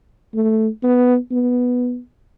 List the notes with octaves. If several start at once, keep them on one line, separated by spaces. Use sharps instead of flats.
A3
B3
B3